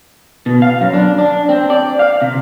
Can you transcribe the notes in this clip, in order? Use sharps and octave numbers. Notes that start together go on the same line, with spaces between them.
B2
F5
F#2
D4
D4
C4
D5
F5
C3